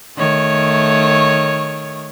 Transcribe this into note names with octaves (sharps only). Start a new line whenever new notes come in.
D#3 A3 C#5